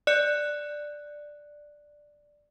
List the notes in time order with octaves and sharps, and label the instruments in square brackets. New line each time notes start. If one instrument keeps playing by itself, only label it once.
[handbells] D5 F#6 C#7